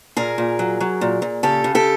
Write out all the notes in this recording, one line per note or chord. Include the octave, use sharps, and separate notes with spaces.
A#2 G#4 A#4
A#2
F#3
F#3
A#2
A#2
C#3 G4 A4
C#3
G4 A4